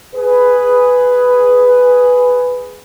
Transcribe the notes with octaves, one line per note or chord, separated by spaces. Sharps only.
G#4 B4